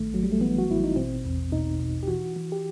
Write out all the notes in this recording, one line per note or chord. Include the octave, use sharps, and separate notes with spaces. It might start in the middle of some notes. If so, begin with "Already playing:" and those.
Already playing: A1 D#3 A3
A1 F#3
G3
A3
E3 B3
F#4
A1 E4
D#4
B2 C4
E2
B2 D#4
B2
G4
E3 F#4
E3
G4